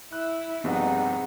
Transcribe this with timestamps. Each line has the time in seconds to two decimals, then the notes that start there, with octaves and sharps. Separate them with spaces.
0.13 E4 F#6
0.64 A#1 G2 B3 C4 D#4 G#4 F#5